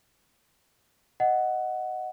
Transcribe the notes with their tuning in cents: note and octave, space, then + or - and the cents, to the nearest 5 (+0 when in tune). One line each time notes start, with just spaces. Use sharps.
D#5 +0 F#5 +5